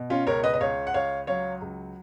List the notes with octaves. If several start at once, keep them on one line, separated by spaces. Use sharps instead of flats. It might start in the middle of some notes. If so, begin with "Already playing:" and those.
Already playing: B2
C#4 F4
C#2 A#4 C#5
B4 D#5
D#5
C#2 C#5 F5
F#5
C#2 C#5 F5
F#3 C#5 F5
C#2